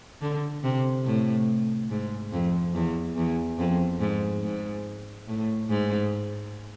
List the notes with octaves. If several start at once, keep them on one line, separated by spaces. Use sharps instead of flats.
D3
C3
A2
G#2
F2
E2
E2
F2
G#2
G#2
A2
G#2